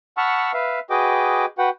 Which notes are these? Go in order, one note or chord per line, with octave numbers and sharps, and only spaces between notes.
F#5 A5 B5 C#6 E6 F6
B4 E5 F5
F#4 G#4 B4 D#5 G5 D6
F#4 B4 F#5 G5